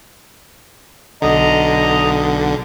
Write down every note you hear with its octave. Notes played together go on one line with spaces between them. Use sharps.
B1 D3 D#5 A#5